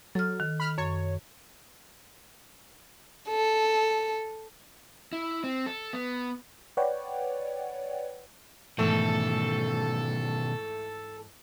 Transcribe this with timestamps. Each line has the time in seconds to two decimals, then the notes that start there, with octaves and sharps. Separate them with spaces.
0.15 F#3 A4 F6
0.40 D#3
0.60 B5 F6
0.78 F#2 C#5
3.29 A4
5.13 E4
5.44 C4
5.66 A4
5.93 B3
6.77 B4 C#5 D5 F#5 G5
8.79 G#2 B2 D#3 E3 A3 A4